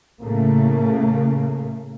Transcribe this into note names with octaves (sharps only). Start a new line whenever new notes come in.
A2 C#3 A3 A#3